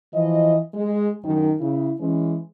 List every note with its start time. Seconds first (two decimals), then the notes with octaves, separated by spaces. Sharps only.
0.13 E3 F3 D#5
0.74 G#3
1.24 F#2 D#3
1.60 C#3 E4
2.00 E3 G#3 C#4